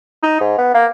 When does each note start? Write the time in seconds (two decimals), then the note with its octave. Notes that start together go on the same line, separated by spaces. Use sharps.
0.23 D#4
0.40 G#2
0.58 B3
0.74 A#3